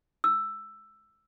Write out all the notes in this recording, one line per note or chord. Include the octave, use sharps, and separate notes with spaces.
E6